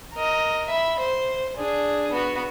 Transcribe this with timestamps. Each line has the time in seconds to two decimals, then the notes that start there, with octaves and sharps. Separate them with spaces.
0.14 A#4 D#5
0.69 E5 B5
0.99 C5
1.56 D4 G#4
2.12 B3 F#4